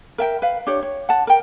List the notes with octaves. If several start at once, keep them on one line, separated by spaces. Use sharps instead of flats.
A#4 E5 G5
B4 F5
D4 G4 C#5
C#5
F#5 A5
A#4 G5